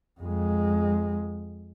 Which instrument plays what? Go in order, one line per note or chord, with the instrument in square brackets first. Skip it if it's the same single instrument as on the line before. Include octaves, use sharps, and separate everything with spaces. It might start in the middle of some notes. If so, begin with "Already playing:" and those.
[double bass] F2 G#3